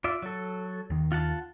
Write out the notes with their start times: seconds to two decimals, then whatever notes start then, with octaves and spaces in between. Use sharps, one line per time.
0.04 F4 D5 E5
0.22 F#3 A4
0.90 D#2 D#3
1.12 F4 F#5 A5